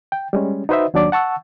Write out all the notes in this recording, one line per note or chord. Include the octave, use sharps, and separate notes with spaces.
G5
G3 G#3 C#4
D#4 F#4 B4 C5 D#5 E5
D#2 F#3 D4 D5 D6
F#5 A5 C#6 E6